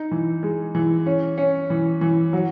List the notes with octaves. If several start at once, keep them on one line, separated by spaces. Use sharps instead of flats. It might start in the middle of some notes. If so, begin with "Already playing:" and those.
Already playing: D#4
E3
G#3
E3
C#4
C#4
E3
E3
F#3